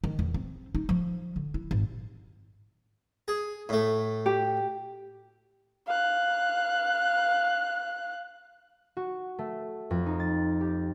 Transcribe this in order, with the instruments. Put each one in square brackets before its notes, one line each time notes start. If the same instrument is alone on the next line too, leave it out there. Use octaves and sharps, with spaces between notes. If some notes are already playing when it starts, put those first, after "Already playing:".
[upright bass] D#3
E2
C4
D#4
F3
D3
E4
G#1
[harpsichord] G#4
A2 A3
[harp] G4
[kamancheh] F5 F#6
[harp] F#4
A3
F2
D#4
A6
G4